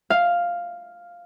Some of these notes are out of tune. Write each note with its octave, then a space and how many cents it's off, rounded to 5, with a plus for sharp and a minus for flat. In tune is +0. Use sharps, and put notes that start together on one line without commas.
F5 +0